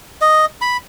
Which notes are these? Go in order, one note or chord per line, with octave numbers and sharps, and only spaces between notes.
D#5
B5